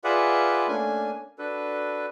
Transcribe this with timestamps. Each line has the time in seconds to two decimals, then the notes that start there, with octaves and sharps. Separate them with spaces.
0.04 F4 G#4 B4 D5 E5 F#5
0.68 A3 A#3 C#4 D4 G#5
1.39 D4 F#4 A4 B4